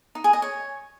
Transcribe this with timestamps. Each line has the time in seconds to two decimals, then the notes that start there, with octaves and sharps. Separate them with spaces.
0.15 D#4
0.24 G#4
0.33 D#5
0.42 C#5